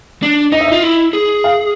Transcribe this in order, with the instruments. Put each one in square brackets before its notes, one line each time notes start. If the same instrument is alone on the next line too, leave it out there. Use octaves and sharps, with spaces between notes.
[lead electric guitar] D4
[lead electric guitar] D#4 [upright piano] D#5
[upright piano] E5
[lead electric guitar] F4 [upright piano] D#5
[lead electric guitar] E4
G#4
[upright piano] F5